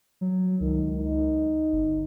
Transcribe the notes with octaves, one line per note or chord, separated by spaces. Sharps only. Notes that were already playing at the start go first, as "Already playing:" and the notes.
F#3
C#2 D#3
D#4
G1